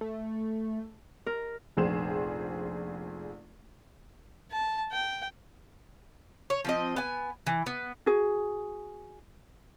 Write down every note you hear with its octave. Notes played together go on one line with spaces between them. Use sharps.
A3
A#4
F1 A#1 G#4 C5 E7
A5
G5
C#5
F3 C4 D#5
B3 G#5
E3
B3
F#4 G#4